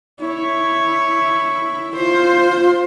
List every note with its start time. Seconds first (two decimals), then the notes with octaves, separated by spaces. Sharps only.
0.20 E4 C#5
1.97 F4 C5